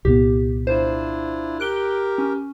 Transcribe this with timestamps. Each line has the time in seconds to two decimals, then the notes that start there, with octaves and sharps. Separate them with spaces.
0.05 C2 A#2 B3 G4
0.67 D4 E4 F4 C5
1.60 G4 A#4 F#6 D7 G7
2.18 C#4